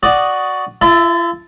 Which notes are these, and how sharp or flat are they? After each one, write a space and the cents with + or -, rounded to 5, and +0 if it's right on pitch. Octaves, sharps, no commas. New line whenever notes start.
F#4 +5 D5 +0 D#6 +0
F4 -45 E5 +0 A5 +0